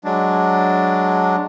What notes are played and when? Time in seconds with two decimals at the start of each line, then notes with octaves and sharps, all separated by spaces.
0.04 F#3 G#3 D4